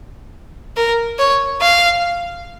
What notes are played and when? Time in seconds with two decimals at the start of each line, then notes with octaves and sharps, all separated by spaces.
0.77 A#4
1.19 C#5
1.61 F5